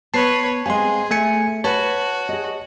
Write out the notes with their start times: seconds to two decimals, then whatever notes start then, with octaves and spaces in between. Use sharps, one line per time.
0.14 B3 B4 C#5 A5 C7
0.66 G#3 C4 G#4 F5 G#5 C6
1.11 A3 E5 G#5 C#7
1.64 F#4 B4 C#5 A5
2.29 G#4 D#5